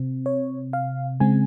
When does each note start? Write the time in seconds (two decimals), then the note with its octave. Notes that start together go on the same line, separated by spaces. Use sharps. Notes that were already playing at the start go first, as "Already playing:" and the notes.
Already playing: C3 C4
0.26 C#5
0.73 F5
1.20 C#3 G#3 C4 G#5